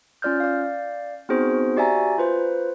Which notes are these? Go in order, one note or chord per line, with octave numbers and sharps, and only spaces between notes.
C#4 F4 D5 F6 G6
D5 F5
B3 C4 D#4 F#4 G#4 C5
F#4 G4 D5 E5 G#5 A#5
F4 B4 C5